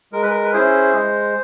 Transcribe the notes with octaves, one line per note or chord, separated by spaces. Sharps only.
G#3 A#4
B4
A#4
B4
C#4 E4 G#4 C5
G#3